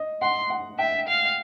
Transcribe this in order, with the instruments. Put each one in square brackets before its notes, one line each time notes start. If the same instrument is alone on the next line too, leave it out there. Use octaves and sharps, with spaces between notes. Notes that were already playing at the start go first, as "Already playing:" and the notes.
Already playing: [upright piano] D#5
[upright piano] F#5 [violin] C6
[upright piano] F#5
[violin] E5 [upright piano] G5
[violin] F5